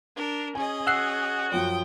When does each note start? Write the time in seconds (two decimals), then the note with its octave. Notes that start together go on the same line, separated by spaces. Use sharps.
0.15 D4 A#4
0.55 C#4 G#4 D#5 G#5
0.87 F#4 F#5 E6 F#6 C7
1.52 F#2 F3 G5 D#6